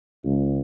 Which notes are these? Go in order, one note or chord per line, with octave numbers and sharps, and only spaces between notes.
C#2